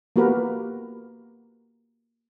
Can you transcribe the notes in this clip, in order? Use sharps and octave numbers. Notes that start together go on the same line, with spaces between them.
A#3 B3 F#4 G4 A#4 B4